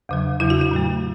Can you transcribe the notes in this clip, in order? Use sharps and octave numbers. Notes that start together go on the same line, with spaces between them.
E2 C#3 F#3
E2 C#3 F#3 E4
F#4
E4
A2 F#3 A3